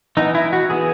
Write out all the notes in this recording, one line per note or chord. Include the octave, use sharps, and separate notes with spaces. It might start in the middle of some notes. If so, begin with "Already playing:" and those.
E3 B3 D#4
E4
F#4
E3 B3 G#4